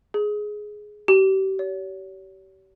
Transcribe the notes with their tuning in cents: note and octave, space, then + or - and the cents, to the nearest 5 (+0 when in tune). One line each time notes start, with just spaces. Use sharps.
G#4 +10
G4 -35
C#5 +35